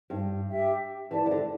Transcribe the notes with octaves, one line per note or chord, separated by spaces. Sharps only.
G2
G4 E5 G5
E3 G4 D5 A5
E3
D3